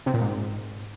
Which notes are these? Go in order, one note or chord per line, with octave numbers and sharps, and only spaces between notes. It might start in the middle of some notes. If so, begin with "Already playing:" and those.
C3
A#2
G#2